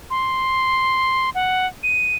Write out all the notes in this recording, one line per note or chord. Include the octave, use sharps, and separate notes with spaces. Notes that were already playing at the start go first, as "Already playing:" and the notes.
C6
F#5
D#7